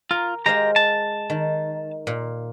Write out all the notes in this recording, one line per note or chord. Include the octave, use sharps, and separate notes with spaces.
F4 A#4
G#3 G4 C5 F5 A#5
A5
D#3
A#2